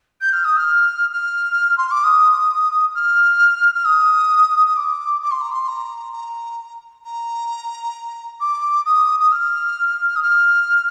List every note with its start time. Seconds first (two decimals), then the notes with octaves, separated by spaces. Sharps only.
0.21 G6
0.32 F6
0.44 D#6
0.57 F6
1.12 F6
1.77 C6
1.91 D6
2.04 D#6
2.94 F6
3.74 F6
3.85 D#6
4.67 D#6
4.76 D6
5.22 D6
5.31 C6
5.41 A#5
5.51 C6
5.68 A#5
6.12 A#5
7.04 A#5
8.40 D6
8.85 D#6
9.19 D#6
9.32 F6
10.16 D#6
10.22 F6